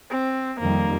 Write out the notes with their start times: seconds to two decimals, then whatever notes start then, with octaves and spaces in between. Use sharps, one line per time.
0.11 C4
0.60 F2 D#3 G3 A#3